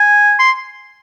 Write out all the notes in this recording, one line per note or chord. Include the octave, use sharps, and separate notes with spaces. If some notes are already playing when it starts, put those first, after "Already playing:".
Already playing: G#5
C6